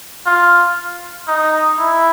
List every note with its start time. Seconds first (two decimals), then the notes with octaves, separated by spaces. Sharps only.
0.26 F4
1.28 D#4
1.79 E4